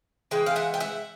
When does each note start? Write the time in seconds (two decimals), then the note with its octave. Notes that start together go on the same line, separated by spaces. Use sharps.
0.31 E3 G#3 G5
0.46 F5
0.56 E5 F#5
0.74 G5
0.80 E5 F#5